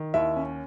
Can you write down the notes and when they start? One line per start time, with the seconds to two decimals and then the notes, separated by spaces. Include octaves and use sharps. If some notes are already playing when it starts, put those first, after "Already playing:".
Already playing: D#3
0.14 D#2 E4 E5
0.36 C#4